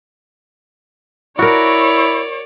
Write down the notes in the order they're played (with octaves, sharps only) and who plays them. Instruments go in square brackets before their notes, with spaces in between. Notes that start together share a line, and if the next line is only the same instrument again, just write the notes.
[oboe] E4 [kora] F#4 A#4 [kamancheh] C#5 D5